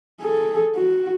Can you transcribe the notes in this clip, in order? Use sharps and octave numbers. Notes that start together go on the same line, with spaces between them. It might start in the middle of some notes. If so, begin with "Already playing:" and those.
G#4 A4
F#4